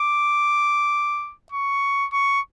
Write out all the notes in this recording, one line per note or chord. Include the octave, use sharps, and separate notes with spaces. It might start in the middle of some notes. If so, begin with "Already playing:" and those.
Already playing: D6
C#6
C#6